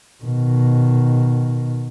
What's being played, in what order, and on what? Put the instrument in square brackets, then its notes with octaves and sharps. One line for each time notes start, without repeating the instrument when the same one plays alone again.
[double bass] B2 D#3